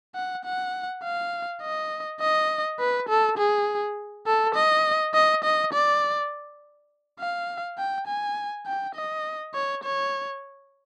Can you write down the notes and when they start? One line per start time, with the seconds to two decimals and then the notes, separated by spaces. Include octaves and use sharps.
0.15 F#5
0.45 F#5
1.04 F5
1.62 D#5
2.21 D#5
2.80 B4
3.09 A4
3.38 G#4
4.27 A4
4.55 D#5
5.14 D#5
5.44 D#5
5.73 D5
7.20 F5
7.78 G5
8.07 G#5
8.66 G5
8.95 D#5
9.54 C#5
9.83 C#5